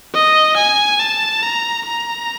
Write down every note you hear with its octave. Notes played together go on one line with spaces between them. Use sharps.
D#5
G#5
A5
A#5
A#5